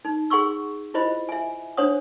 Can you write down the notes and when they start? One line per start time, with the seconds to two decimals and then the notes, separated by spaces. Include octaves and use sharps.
0.05 D#4
0.30 G#4 F#5 C6 C#6 E6
0.94 E4 F4 C5 D#5 B5
1.29 E5 G#5
1.77 D4 C5 C#5 F#5 D#6